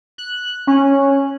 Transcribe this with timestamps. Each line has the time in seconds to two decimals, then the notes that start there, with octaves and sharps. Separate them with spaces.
0.18 F#6
0.67 C#4